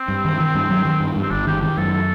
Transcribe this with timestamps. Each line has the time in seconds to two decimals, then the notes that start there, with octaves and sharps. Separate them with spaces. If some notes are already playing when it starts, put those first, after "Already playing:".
Already playing: C4
0.08 G2
0.25 D#3
0.40 D#3
0.55 G2
0.70 F#3
0.85 D#3
1.00 G2
1.16 G2
1.22 C4
1.31 G1 D4
1.47 D#3 G4
1.62 D#3 G4
1.77 F#2 A4
1.92 A4